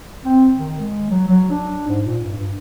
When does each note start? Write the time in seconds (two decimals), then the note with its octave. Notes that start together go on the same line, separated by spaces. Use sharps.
0.25 C4
0.57 D#3
0.80 G#3
1.10 F#3
1.27 F#3
1.50 D4
1.87 G#2
2.05 A#2
2.23 G2
2.35 G2